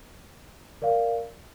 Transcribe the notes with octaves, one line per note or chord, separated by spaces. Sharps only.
A#4 D5 F5